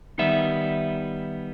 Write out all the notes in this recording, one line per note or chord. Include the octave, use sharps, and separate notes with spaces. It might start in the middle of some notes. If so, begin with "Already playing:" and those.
D#3 G3 B3 D#4 E5